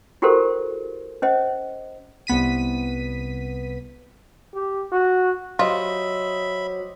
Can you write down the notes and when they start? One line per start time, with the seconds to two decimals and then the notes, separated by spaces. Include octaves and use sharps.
0.22 E4 F#4 G4 A4 A#4 C5
1.22 C#4 C5 D#5
2.27 C2 B3 B6 D#7
4.55 G4
4.92 F#4
5.59 F#3 F4 G4 C5 D#5 E5 B5